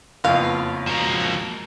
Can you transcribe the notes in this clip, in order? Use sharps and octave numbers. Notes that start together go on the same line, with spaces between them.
F#1 F2 A#3 B3 F4 C#5 F5
F3 G#3 A#3 F#4